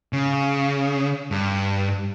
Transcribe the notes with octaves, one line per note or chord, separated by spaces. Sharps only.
C#3
G2